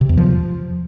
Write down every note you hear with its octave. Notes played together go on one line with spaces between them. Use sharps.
C3
E2
F3